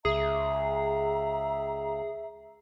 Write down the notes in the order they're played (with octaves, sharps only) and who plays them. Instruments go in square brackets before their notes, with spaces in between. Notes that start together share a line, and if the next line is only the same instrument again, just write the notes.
[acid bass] C#2 [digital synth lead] G#4 [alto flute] E5 [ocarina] A#5